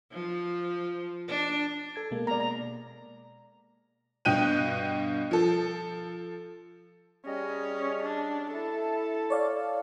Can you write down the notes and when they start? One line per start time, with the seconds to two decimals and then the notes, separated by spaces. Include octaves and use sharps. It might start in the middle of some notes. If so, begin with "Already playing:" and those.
0.12 F3
1.28 D4
1.96 A4 G#6
2.11 B2 G#3 A#3
2.27 D5 A#5
2.40 A#5
4.25 G2 B2 G5 F#6 G6 D#7
5.31 F3 A4
7.26 G3 C#4 G#4 D#5
8.03 D4
8.53 E4 A4 A5
9.30 C#5 D5 F5